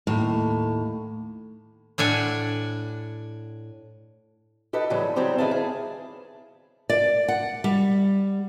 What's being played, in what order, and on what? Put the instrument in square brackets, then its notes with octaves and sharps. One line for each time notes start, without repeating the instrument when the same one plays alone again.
[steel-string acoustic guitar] D#2 A2
[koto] A2 D4 F#5 G#5
[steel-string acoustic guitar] G4 A4 B4 D#5
A2 C#3 E3 F#3 G3
C#3 F#3 G3 C4 G4 G#4
D#3 B3 E4 G#4 F5 A5
G#4
[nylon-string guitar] D5
F#5
G3